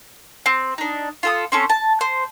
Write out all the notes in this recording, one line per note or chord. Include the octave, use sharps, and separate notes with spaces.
C4
D4 D#4
F4 A4 D#6
C4 C#4 A4
A5
C5